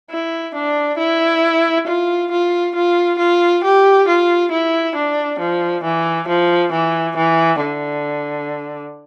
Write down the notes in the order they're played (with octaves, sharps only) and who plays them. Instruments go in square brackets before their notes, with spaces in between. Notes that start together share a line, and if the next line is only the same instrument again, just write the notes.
[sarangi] E4
D4
E4
F4
F4
F4
F4
G4
F4
E4
D4
F3
E3
F3
E3
E3
D3